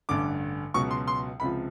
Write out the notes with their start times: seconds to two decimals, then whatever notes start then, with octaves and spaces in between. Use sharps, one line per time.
0.09 A1 G2 D3 D6
0.74 C#2 B2 F#3 C#6
0.91 C6
1.07 C6
1.40 C#2 C3 F3 B5